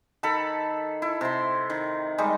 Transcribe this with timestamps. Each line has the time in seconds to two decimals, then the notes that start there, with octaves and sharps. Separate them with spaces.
0.23 D#3 A4 B5
1.02 E4
1.21 C3 C6
1.70 D#3
2.18 G3 G#3 D#4